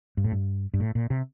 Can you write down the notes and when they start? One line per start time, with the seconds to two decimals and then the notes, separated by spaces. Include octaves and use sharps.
0.17 G2
0.24 A2
0.32 G2
0.74 G2
0.80 A2
0.95 A#2
1.10 C3